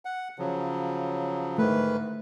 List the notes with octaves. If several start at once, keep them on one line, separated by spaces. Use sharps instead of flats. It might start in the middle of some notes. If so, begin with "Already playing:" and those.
F#5
C#3 F3 F#3
G#2 D#3 A3 B4